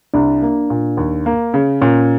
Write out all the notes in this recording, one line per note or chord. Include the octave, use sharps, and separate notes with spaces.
C2 D4
A#3
A#2
D#2
A#3
C#3
A#2 C#4